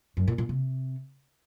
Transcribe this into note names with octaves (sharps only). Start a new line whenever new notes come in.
F#2
A#2
A#2
C3